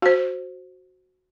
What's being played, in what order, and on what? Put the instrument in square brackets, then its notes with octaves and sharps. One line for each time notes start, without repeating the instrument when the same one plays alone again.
[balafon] F#4 C5